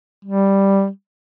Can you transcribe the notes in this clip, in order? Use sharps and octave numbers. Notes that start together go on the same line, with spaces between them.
G3